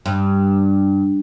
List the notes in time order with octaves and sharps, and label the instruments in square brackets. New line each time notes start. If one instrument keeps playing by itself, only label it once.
[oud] G2